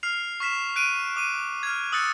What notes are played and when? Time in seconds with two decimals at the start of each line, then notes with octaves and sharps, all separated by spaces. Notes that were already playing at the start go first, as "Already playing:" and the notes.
0.03 F6 C7 F7
0.40 C#6 F6 B6 E7
0.76 F#6 D7 D#7
1.16 D6 D#7
1.63 F6 G#6
1.92 D#6 E6 F#6 A6 C#7